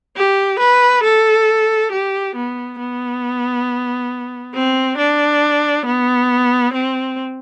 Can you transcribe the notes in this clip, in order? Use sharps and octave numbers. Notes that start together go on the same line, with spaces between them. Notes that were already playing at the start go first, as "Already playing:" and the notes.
G4
B4
A4
G4
B3
B3
C4
D4
B3
C4